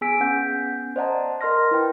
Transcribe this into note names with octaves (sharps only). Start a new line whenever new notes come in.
B3 G#4 G#5 E6 B6 D7
B3 C#4 F#5 G6
C5 D5 D#5 F#5 A5 A#5
A#4 D#5 C6 F6 A#6
E4 B4 G5